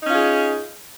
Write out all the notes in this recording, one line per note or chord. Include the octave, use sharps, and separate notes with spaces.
C#4 D#4 F4 G#4